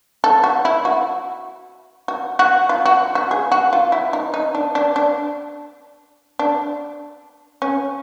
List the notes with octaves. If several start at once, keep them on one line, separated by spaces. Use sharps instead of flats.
A4
F#4
E4
F#4
F#4
F#4
F4
F#4
F#4
G#4
F#4
F4
E4
D#4
D#4
D4
D4
D4
D4
C#4